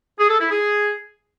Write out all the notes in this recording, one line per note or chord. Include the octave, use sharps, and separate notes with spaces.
G#4
A4
E4
G#4